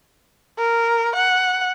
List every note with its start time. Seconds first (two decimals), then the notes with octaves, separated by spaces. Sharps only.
0.59 A#4
1.15 F#5